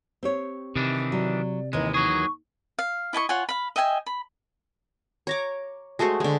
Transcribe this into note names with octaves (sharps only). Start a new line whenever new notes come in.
C4 G4 C#5
C3 D#3 E3 D4
F#3 D5
D#2 D#3 E3 G#3 D#5
F#3 G#4 C#6
F5
E4 D#5 G#5 C#6
F4 C#5 F#5 G#5
F5 B5
D#5 E5 G5 G#5
B5
C#5 A#5 D6
G#3 A3 F#4 C5
D3 G#3